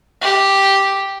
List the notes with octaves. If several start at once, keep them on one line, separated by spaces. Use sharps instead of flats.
G4